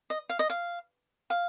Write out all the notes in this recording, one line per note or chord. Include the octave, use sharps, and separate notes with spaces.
D#5
F5
D#5
F5
F5